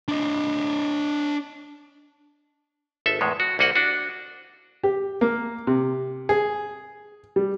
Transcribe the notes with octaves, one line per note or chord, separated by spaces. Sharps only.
D4 D#5
G#1 A4 E5
E2 A2 G#3
F#4
C2 A#3 F#4 D#5 F#5
D4 F#4
G4
A#3
C3
G#4
G3